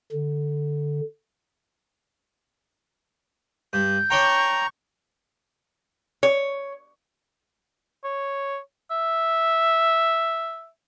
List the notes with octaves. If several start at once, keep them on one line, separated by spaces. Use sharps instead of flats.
D3
G2 G6
D4 C#5 G5 A#5 C#6
C#5
C#5
E5